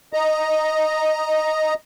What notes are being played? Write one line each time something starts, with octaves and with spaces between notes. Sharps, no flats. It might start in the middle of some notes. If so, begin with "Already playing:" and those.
D#5 A#5